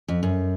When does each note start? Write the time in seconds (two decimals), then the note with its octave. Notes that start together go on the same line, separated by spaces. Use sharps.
0.08 F2
0.23 F#2